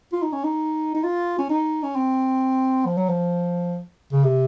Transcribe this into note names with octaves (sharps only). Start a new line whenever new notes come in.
F4
D#4
C#4
D#4
D#4
F4
C#4
D#4
C#4
C4
F3
F#3
F3
C#3
C3